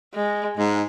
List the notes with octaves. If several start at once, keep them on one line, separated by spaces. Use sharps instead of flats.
G#3
G#2 G#3